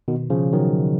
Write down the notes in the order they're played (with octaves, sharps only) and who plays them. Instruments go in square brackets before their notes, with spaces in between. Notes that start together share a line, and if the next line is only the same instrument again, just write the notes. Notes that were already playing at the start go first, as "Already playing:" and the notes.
[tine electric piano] B2 D#3
C#3 F3
D#3 F#3